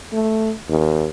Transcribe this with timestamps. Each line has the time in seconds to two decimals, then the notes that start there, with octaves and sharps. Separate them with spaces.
0.13 A3
0.69 D#2